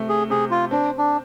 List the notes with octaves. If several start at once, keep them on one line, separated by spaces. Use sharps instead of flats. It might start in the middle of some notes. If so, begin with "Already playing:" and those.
Already playing: C3 A3
G#4
C3 G#4
F4
C4 D4
D4